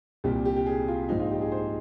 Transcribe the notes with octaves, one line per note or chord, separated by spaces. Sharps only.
C2 A#2 G3 G4
G4
G4
G#4
F4
A#1 G#2 F3 D#4
F4
G4
G#4
C5